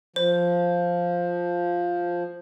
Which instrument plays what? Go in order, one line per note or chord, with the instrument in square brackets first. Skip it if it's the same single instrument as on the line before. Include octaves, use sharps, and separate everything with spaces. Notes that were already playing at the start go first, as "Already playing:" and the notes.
[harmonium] F3 [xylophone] C5